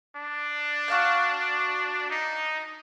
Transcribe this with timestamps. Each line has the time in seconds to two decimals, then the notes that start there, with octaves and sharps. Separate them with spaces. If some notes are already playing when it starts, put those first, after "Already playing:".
0.16 D4
0.88 F#4 F5 F#6
2.10 D#4